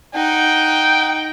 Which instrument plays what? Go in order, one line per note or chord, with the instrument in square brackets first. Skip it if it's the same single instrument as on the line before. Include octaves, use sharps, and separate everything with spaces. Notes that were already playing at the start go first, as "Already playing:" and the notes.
[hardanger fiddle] D#4 F#5 [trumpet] G5